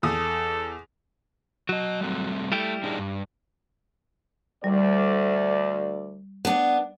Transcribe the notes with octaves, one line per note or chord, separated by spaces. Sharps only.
E2 A4 D#6
F#3 F#4 D#5
G3 A3 C4
G3 A3 E4 G4
D4 D#4 G#4
G2
D2 G3 D5
B3 D4